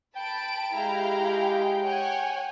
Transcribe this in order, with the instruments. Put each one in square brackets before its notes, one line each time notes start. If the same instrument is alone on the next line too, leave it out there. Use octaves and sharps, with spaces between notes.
[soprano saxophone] G5 [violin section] A5 B5 D7
[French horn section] G#3 G4 [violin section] E4 F5 A#5
[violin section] C#5 F#5 G#5